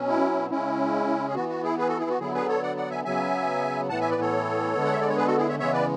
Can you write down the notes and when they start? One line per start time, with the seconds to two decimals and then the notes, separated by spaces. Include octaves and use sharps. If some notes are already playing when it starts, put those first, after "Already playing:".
Already playing: B2 F#3 C#4
0.08 E4
0.50 C#3 G#3 C#4 E4
1.28 G#4
1.35 E3 B3 F#4
1.49 F#4
1.63 E4 G#4
1.78 G#4 B4
1.88 F#4 A4
1.99 E4 G#4
2.10 F#4
2.20 D3 F#3 B3 E4 G#4
2.34 G#4 B4
2.48 A4 C#5
2.62 D5 F#5
2.77 D5 F#5
2.90 E5 G#5
3.05 C#3 F#3 B3 E5 G#5
3.89 A2 E3 B3 F#5 A5
4.00 E5 G#5
4.10 B4 D5
4.21 A4 C#5
4.74 D3 G#3 B3
4.85 F#5
4.92 E5
5.01 D5
5.09 C#5
5.17 G#4 B4
5.27 F#4 A4
5.37 E4 G#4
5.48 C#5 E5
5.59 C#3 E3 G#3 B3 C#5 E5
5.73 B4 D5